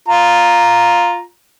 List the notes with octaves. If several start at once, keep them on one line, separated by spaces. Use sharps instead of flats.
F4 A#5